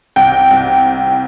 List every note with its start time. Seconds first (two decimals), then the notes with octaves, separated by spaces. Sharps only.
0.16 C2 G5
0.51 C2